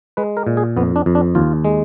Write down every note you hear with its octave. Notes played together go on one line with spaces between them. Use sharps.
G#3 B4
A#4
A#2
G#4
F2 B3
D4
F2
D4
D#2 F4
G#3